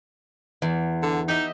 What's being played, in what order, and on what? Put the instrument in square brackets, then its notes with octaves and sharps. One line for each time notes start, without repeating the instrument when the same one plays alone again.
[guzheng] E2
[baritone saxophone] D3
[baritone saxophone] D#4 [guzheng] G4 D#5 E5